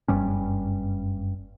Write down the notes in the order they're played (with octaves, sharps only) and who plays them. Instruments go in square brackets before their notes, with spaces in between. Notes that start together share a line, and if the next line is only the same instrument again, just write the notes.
[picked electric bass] F#1 G2 G3 C#4